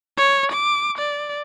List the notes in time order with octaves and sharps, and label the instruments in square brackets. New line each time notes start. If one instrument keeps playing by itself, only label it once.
[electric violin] C#5
D6
D5